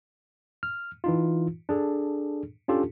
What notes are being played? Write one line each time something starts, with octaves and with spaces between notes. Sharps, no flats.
F6
E3 D#4 F4
D4 G#4 A4
C#4 D4 F4 G4 A4